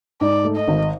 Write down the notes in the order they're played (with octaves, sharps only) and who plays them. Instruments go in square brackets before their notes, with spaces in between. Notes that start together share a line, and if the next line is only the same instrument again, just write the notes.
[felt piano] G#2 [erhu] D5
[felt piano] A3
[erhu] D#5
[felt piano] G#1